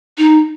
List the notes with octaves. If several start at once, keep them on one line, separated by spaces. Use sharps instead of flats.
D#4